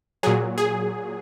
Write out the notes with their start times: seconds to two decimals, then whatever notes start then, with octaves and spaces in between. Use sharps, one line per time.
0.23 A#2 F#3 G#4
0.58 G#4